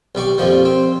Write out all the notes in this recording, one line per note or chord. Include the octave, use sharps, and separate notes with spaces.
B1 G3 D5 C#6
F2 A#2 F3 G3
C4